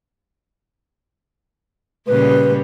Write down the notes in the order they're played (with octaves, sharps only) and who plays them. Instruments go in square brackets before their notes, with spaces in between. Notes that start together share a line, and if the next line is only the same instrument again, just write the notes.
[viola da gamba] A#2 C#3 G3 [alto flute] B4